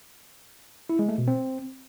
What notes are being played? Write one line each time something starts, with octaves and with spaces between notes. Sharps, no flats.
E4
G#3
A3
B2
C4